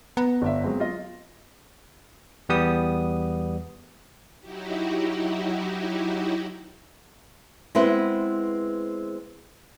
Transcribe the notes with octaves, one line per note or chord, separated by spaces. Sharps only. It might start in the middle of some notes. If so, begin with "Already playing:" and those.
B3 A#5
G1 D4 E5
F#3 G#3 C4
F4 D#5
E2 G3 B3 D#6
F#3 D#4 E4 F#4 G4
G#3 B3 C4 E4 B4